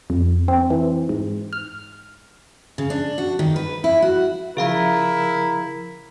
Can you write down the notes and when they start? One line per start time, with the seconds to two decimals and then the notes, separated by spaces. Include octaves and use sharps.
0.10 F2
0.48 C4
0.70 E3
1.09 G#2
1.53 F6
2.78 C#3
2.90 D4
3.18 F#4
3.39 D#3
3.56 B4
3.84 E4
4.02 F#4
4.57 C#3 F3 E4 G#4 A#4 F5 A#5